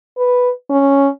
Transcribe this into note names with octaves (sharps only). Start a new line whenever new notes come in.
B4
C#4